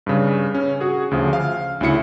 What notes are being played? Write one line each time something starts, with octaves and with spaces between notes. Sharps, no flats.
G2 C#3
C#4
F#4 G#4
D2 C#3 F3
F5
D2 C#3 E4 C#7